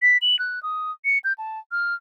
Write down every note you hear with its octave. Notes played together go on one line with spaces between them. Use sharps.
B6
F#7
F#6
D#6
C#7
G6
A5
F6